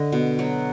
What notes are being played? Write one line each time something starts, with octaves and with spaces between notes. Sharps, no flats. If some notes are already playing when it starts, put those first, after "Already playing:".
Already playing: D3 D#5
B2
F#3